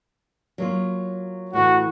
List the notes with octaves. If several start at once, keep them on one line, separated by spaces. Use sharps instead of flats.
F#3 A#3 F4
A2 E3 F#4